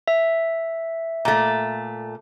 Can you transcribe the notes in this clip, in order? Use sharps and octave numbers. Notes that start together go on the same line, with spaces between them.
E5
A#2 A3